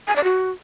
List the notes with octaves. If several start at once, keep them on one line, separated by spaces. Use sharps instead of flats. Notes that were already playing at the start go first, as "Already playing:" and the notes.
G#5
D5
F#4